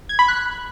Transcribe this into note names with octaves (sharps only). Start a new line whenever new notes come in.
G#6
B5
F#6